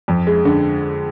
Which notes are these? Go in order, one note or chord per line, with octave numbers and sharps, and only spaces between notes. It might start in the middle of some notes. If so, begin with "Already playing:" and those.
F2
G#3
D3